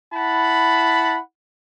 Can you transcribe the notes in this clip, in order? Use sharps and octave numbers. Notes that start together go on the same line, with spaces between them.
E4 F#5 A5 B5